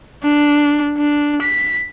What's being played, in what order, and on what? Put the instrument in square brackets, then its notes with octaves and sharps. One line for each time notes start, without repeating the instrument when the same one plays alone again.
[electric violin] D4
D4
B6